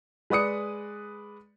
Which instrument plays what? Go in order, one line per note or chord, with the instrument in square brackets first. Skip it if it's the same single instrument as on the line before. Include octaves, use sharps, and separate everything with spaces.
[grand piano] G#3 B4 D5 D#6 C#7